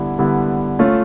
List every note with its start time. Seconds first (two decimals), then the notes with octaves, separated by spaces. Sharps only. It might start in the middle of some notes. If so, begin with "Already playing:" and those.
Already playing: D3 G3 B3 E4
0.19 D3 G3 B3 E4
0.79 A3 C#4 F4